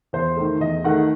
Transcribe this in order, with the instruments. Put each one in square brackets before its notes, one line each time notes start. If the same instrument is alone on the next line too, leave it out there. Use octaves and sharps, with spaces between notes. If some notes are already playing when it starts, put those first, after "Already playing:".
[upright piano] E2 C5
D#3 A3
E2 D#5
D#3 A3 F#5